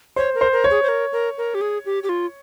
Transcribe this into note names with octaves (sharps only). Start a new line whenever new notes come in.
C5 C#5
A#4
C5
A#4
C#5
G#4
C5
A#4
A#4
A#4
G4
G#4
G4
G4
F4